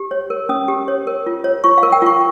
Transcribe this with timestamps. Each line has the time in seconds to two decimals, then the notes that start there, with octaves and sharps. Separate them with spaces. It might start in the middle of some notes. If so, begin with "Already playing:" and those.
Already playing: G4
0.11 C#5
0.30 A#4
0.49 C#4 D#6
0.68 G4
0.88 C#5
1.07 A#4
1.26 F4
1.44 C#5
1.64 F4 C#6
1.78 F5
1.83 A#4
1.92 G5
2.02 F4 C#6